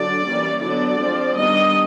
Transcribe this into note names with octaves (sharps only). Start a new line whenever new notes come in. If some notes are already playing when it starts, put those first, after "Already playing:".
Already playing: D3 F#3 D4 D5
E3 G3 A#3 C#4
D3 F#3 B3 D4 D5
F3 G#3 C4
D#3 G3 B3 D4 D#5